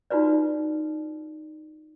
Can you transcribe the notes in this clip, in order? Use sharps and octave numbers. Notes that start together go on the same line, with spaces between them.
D#4 F4 F#4 B4 D5